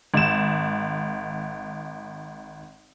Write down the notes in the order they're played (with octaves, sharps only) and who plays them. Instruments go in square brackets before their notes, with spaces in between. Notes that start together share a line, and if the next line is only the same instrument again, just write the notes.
[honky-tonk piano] G#1 E7